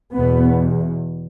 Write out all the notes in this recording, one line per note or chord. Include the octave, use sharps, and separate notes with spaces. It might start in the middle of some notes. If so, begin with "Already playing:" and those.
E2 B2 B3